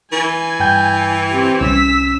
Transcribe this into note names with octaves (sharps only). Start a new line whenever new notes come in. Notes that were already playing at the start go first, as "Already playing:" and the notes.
E3 G#5
G2 G5 G6
C4 G4
C2 C#4 E6 B6